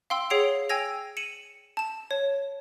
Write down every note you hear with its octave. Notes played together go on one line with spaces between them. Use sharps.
F5 G5 C6 E6
G#4 C#5 F#5 C7 D7 F7
G5 G#5 E6 G#6 A#6 F7
C#7 D#7 E7 F#7
A5 E7
C#5